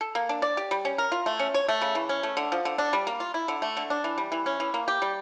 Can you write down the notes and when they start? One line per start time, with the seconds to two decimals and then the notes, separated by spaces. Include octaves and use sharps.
0.01 A4
0.15 A#3
0.29 D4
0.42 D5
0.57 G4
0.71 G3
0.85 C#4
0.98 A#4
1.12 F4
1.26 A3
1.39 C#4
1.54 C#5
1.68 A3
1.82 C#3
1.95 E3
2.09 C#4
2.23 A3
2.37 D3
2.52 F3
2.65 D3
2.78 D4
2.93 G3
3.07 A#3
3.20 F4
3.34 E4
3.48 D3
3.62 A3
3.77 D3
3.90 D4
4.04 E3
4.18 G3
4.32 E3
4.46 C#4
4.60 E3
4.74 A#3
4.88 G4
5.02 G3